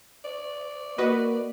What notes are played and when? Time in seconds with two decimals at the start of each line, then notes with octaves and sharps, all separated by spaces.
0.25 D5
0.98 A#3 F#4 B4 D#5